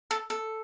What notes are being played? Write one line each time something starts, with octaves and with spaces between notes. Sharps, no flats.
A4
A4